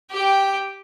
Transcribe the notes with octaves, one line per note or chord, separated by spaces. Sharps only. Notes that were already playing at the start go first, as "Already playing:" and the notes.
G4 G5